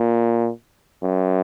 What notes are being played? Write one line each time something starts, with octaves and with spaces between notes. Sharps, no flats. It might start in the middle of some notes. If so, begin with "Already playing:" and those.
Already playing: A#2
F#2